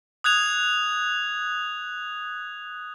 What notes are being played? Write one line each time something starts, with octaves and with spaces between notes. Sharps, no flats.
D#6 F#6 G#6 F7